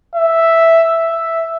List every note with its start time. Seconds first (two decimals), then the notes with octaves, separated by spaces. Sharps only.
0.15 E5
1.10 E5